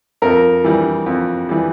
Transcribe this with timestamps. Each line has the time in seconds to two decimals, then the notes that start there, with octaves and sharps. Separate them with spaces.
0.22 F2 A#4
0.64 E3 G3
1.06 F2
1.49 E3 G3